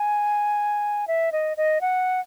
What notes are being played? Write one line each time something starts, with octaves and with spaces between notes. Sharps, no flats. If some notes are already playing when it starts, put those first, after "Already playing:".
Already playing: G#5
E5
D#5
D#5
F#5